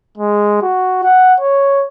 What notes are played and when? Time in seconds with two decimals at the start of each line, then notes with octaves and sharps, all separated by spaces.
0.18 G#3
0.62 F#4
1.03 F#5
1.41 C#5